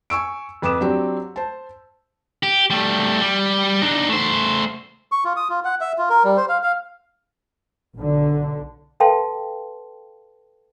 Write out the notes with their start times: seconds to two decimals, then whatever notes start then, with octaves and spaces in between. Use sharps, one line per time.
0.10 G#5 C#6 E6 D7
0.62 F2 B4 D6 D#6 E7
0.80 F#3 C4 D4 G4
1.36 C5 A5
2.43 G4
2.70 G3 A3
3.22 G3
3.82 D4 D#4
4.09 A3 C5
5.12 C#6
5.25 F4
5.36 D#6
5.49 F4
5.65 F#5
5.81 E5
5.98 F4
6.10 A#4
6.24 G3
6.37 C5
6.49 F5
6.63 F5
7.95 B1 D3
9.00 A4 B4 F5 G5 A5 C6